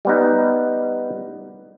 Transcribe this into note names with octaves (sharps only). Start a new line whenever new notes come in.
G3 B3 D#4